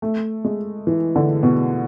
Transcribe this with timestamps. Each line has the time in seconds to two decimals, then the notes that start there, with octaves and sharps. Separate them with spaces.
0.02 A3
0.45 G#3
0.87 E3
1.16 D3
1.43 B2